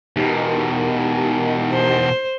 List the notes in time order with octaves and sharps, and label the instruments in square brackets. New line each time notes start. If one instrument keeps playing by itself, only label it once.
[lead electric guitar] E2 B2 [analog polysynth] D#4 G4 A#4
[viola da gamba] C5